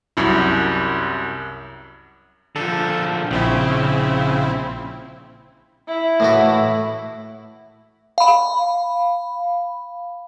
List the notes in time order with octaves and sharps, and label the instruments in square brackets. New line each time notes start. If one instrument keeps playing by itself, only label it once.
[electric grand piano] C2 F#2 E4
[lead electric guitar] D3 F3 [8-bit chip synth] A4
[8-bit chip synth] A#1 C4 E4 [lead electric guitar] C#3
[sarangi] E4
[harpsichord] A2 E3 F#4
[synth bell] F5 B5